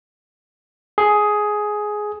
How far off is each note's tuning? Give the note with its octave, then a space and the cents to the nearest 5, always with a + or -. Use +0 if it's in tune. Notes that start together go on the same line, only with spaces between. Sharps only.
G#4 +10